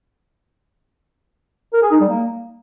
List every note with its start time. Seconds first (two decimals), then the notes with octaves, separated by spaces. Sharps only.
1.73 A#4
1.82 G#4
1.91 D#4
2.00 G3
2.09 A#3